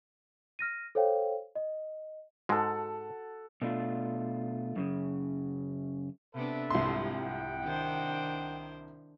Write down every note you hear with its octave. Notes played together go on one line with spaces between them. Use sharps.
F6 A#6 D#7
A4 C5 C#5 F5 G5
D#5
G#2 G#3 F#4 A4 F#5 A5
B2 A3 D4 F4
F#2 A2 C#3
C3 B3 D4 A4 B4 E5
C2 G#2 C3 F3 C6
F#5 G5
D#3 D4 C5